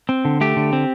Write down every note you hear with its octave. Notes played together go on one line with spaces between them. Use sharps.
C4
D3
A3 G4
D3
C4